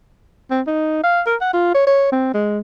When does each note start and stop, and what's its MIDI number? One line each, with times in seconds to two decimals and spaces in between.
0.51 0.61 60
0.67 1.01 63
1.03 1.22 77
1.26 1.36 70
1.41 1.51 78
1.54 1.74 65
1.74 1.87 73
1.87 2.07 73
2.12 2.33 60
2.34 2.59 56